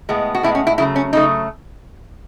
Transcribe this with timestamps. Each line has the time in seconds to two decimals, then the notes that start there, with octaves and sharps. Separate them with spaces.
0.09 A2 G#3 B3
0.35 F#4
0.43 A2 G#3 B3 E4
0.55 C#4
0.67 E4
0.78 C#3 F#3 A3 E4
0.96 C#4
1.13 C#3 F#3 A3 D#4